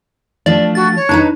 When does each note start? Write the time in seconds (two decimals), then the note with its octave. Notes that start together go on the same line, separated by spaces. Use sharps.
0.46 F3 A3 D4 D5
0.75 F#4 A6
0.96 C#5
1.09 D4 D#4 B4 A#5